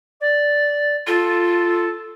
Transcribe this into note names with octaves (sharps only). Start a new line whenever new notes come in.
D5
F4 A4